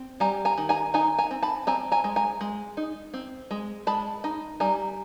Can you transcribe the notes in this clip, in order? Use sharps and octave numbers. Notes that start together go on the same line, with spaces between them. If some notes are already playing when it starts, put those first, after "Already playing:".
Already playing: C4
G3 G#5 A#5
G#5 A#5
D#3
G#5 A#5
D#4 G#5 A#5
G#5 A#5
C4
A5 B5
C4 G#5 A#5
G#5 A#5
G#3
G#5 A#5
G#3
D#4
C4
G#3
G#3 A5 B5
D#4
G3 G#5 A#5